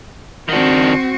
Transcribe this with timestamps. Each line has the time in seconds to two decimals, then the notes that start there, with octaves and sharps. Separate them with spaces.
0.49 D#3 C4 D4 F#4